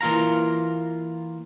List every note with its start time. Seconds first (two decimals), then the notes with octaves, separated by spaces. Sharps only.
0.01 E3 A#3 F4 F5 A#5